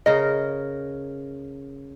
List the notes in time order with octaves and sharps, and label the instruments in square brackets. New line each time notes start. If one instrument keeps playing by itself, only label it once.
[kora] C#3 A#4 [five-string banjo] D#5